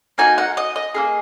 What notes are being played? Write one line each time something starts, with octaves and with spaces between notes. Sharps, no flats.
A#3 D#4 F#4 G#5
F#5
D#5
D#5
A#3 F4 G#4